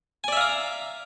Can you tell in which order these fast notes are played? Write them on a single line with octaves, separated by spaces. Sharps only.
G#5 D5 E5 F5 A#5